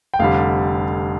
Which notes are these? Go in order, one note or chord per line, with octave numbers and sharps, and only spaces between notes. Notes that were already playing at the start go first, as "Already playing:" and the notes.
G5
F1 F2 D3 G3 F5